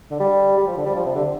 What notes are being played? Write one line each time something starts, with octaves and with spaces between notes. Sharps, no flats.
D3
G3
G3
F3
D3
G3
F3
C3
D3